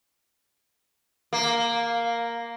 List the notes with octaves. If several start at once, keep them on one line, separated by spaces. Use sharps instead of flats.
A#3